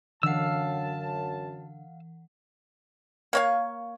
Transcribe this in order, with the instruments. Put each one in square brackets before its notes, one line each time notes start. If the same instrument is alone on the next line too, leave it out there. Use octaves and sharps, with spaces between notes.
[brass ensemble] F#2 A5 [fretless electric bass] D3 [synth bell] E3 F#5 [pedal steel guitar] F5 E6
[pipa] A#3 C#5 F5